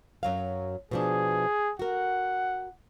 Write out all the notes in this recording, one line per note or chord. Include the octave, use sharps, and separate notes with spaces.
F#2 F#3 F5
B2 F3 D4 G#4
F#4 A#4 F#5